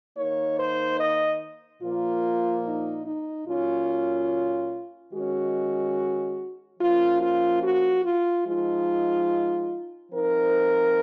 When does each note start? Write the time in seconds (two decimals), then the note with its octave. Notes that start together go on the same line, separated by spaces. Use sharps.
0.16 D#3 A#3 D#4 C#5
0.58 C5
1.00 D#5
1.82 A#2 F3 A#3 F4
2.65 D#4
3.06 D#4
3.48 A#2 F#3 C#4 F4
5.14 D#3 G#3 C#4 F#4
6.80 F3 A#3 C#4 F4
7.22 F4
7.63 F#4
8.04 F4
8.46 F3 G#3 D#4 F4
10.12 F3 C4 D#4 A#4